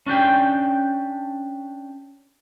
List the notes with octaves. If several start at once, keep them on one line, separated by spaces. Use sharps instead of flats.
C#4 D4 G4 G5